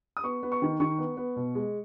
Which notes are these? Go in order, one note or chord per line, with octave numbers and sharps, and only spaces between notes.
D#6
B3 C#6
B3
C#6
D#3
D#3 C#6
B3
B3
B2
G#3